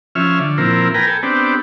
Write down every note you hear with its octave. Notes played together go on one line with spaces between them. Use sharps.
F3 C#4 E5 F6
D3
A#2 F3 C4 E4 A#4
A#4 B4 G5 G#5 A#5
A4 G5 G#5
B3 C4 D4 G4